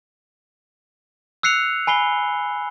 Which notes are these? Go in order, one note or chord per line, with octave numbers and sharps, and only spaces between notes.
E6 F#6 C7 C#7 F7
G#5 B5 C7 G7